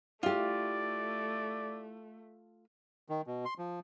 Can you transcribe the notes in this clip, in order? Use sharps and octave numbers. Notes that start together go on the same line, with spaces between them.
A3 E4 F4 G4 D5
D#3
B2
C6
F3